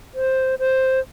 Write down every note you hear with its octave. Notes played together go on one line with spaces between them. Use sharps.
C5
C5